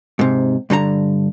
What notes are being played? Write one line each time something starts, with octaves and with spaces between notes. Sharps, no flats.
G#2 C3
G2 D3 A4 A#5